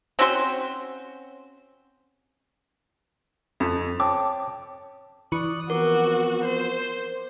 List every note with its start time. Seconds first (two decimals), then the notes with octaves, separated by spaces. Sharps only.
0.19 C4 C#4 F#4 C5
3.60 F2
4.00 C#5 G5 A5 D6
5.32 E3 D5 C#6 D#6 F#6
5.70 F3 B3 C4 F#4 A#4 D6
6.45 C5